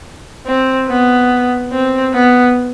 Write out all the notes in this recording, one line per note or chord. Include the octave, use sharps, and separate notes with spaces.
C4
B3
C4
B3